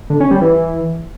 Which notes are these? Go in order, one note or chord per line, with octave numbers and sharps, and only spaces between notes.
D3
C#4
G3
E3